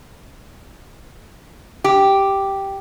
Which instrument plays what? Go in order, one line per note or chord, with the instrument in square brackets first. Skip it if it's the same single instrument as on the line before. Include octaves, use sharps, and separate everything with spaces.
[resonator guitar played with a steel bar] G4